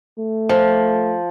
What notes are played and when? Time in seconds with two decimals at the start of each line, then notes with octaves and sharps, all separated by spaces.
0.19 A3
0.49 F3